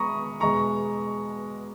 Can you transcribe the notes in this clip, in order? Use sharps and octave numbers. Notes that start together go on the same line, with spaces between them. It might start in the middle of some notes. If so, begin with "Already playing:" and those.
Already playing: G#3 A#5 B5 C#6 D#6
E2 B2 G#3 A#5 C#6